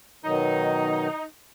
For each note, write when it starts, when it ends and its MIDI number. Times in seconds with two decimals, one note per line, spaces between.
0.25 1.08 47
0.25 1.08 51
0.25 1.08 54
0.25 1.23 63